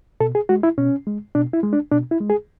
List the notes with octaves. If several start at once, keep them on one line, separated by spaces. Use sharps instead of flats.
B2 A4
G#4
G#3 F#4
E4
B2 C#4
G#3
B2 D4
E4
G#3
D4
B2 D4
E4
G#3
G#4